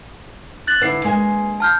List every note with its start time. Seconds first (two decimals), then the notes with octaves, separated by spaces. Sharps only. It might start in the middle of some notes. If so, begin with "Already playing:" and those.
0.67 F#6 A6 F#7
0.82 D3 E4 B4 C7
1.05 G#3 A#3 G#5
1.60 A5 F6 G6